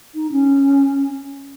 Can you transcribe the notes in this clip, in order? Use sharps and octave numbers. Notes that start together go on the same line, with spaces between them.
D#4
C#4